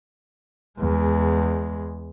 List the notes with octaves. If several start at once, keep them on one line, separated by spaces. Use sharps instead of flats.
E2 G#3